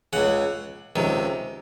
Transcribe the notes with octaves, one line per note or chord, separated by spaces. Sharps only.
C#2 C#3 F#5
C#2 C3 D#3